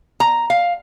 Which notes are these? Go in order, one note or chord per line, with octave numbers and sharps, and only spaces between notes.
A#5
F5